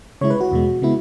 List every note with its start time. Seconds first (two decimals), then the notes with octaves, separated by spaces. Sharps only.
0.21 C#3 G#3 E4 C#5
0.30 B4
0.41 F#4
0.52 E2 B2 G#3
0.82 C#3 G#3 B3 E4